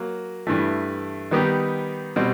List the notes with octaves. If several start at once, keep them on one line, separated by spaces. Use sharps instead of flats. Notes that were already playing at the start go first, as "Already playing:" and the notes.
Already playing: F#3 A#3
G2 E3 A3
D#3 G3 B3 D#4 G4
B2 G3 C4